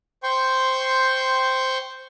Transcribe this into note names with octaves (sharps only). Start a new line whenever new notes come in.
C5 G5 C6 C#6